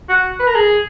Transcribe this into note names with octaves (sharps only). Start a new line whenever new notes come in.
F#4
B4
A#4
G#4